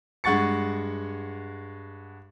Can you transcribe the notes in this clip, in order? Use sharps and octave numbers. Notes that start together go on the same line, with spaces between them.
G2 G#3 F#5 C#6 A6 C#7